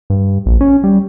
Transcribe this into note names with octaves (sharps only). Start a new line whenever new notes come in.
G2
A#1
C#4
G3